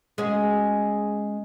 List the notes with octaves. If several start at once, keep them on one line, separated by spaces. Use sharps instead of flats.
G#3 C#4 F#4